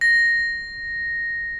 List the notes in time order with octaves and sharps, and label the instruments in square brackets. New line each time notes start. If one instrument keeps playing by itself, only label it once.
[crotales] A#6